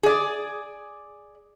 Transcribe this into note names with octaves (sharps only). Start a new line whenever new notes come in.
G#4 D5